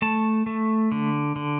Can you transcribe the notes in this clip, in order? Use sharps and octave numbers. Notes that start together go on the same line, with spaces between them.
A3 A5
A3
D3
D3